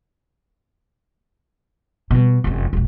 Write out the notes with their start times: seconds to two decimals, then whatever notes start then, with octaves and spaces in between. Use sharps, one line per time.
2.11 B2 G3
2.44 F1 F#2
2.73 E1 A#1